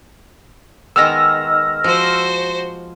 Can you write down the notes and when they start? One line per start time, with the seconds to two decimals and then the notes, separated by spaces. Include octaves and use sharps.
0.96 D#3 G#3 B3 E6 F6 A#6
1.84 F3 F#4 C5